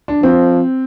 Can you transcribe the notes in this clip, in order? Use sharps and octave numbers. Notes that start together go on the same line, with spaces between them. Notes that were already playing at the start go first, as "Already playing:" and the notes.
D4
F3 C4